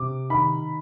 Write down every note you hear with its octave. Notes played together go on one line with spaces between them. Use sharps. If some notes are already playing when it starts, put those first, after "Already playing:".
Already playing: C3 D6
D#3 B5